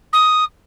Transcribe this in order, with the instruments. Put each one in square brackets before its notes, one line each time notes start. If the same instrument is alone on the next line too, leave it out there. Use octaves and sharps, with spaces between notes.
[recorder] D#6